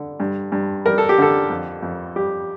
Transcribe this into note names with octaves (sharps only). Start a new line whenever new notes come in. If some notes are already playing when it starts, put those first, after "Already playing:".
Already playing: D3
G2
G2
G3 A#4
A4
G4
D3 A4
F2
F2
G3 G4